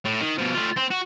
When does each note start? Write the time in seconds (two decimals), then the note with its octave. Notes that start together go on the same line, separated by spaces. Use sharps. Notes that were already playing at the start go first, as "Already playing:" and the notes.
0.05 A2
0.21 D#3
0.38 B2 F3
0.55 A3 F4
0.77 C4
0.91 F#4